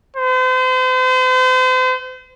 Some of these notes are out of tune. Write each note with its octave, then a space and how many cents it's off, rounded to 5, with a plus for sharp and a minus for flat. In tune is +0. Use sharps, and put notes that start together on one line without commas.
C5 -40